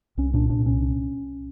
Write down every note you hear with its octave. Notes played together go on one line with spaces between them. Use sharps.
C2 C#4
A#2 D4
C2 D4
C#4